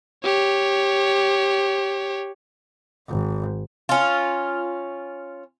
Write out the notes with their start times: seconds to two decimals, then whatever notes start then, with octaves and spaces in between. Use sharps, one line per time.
0.24 G4 C#5
3.09 G#1
3.89 C#4 F4